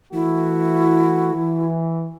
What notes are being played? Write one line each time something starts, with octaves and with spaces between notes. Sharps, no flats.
E3 A3 E4 F#4
E3